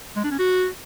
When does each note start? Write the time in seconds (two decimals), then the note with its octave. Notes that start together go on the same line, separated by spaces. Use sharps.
0.17 G#3
0.24 D4
0.32 C#4
0.39 F#4